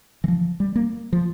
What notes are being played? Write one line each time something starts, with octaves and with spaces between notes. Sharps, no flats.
E3
F3
G3
A#3
F3